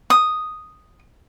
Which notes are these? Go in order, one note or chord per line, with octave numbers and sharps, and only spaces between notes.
D#6